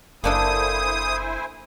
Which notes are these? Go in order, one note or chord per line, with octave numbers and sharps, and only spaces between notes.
F#1 A#3 D4 E4 A4 C5 G#5 D#6